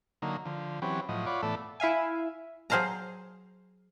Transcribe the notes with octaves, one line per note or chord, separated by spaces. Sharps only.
D3 F#3 A#3 D#4
D3 F3
E3 F#3 C4 C#4 G4 B4
A2 F3 F#3 D#5
F4 C#5 D5 F#5 B5 D6
A2 E3 A3 B3 A4 D5
E4 E5 F5 G#5
F#3 G#4 C5 F5 A5 A#5